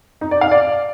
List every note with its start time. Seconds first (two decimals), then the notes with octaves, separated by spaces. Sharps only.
0.21 D#4
0.31 D5
0.41 F5
0.51 D5